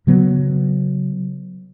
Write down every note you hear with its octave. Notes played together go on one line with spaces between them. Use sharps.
C#3 F#3 B3